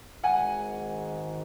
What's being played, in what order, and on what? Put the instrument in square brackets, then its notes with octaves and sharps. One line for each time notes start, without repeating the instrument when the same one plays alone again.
[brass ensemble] G#1 G#2 D#3 G#3 [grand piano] F#5 G#5